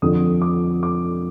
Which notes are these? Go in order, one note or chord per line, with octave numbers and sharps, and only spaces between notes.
F2 D3 F3 D#6
D6
D6